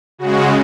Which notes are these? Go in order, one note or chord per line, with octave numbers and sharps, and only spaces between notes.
C#3 G#3 F#4